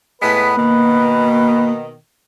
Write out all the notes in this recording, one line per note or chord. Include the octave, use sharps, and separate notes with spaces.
A2 G#3 B3 B4 B6
B2 D#3 A#3